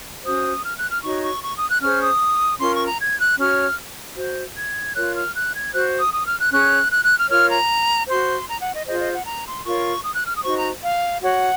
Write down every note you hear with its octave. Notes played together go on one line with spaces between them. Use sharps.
C#4 F#4 C5 D#6
F6
F#6
F6
D#4 F#4 C#5 C#6
C#6
C#6
D#6
F#6
C#4 G#4 C5 F6
D#6
C#4 F4 A#4 C6
C#6
A#5
G#6
F#6
C#4 F#4 C#5 F6
F#4 C5
G#6
F4 A#4 C#5 F#6
F6
F#6
G#6
F#4 C5 F#6
D#6
D#6
F6
F#6
C#4 G#4 C#5 F#6
F#6
F#6
F6
F4 A#4 C#5 F6
A#5
F#4 C5 C6
A#5
F#5
D#5
F4 G#4 C5 D#5
D#5
F#5
A#5
C6
F4 A#4 C#5 C#6
D#6
F#6
F6
D#6
D#4 F#4 C5 C#6
A#5
F5
F#4 C#5 F#5